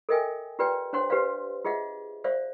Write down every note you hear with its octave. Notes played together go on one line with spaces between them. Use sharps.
A4 A#4 D#5 E5 G5 G#5
F4 G4 B4 D5 G5
D4 C5 C#5 F#5 C6
G4 B4 C5 D5 F5
F4 G#4 D#5 E5 F#5
C5 D5 E5 F5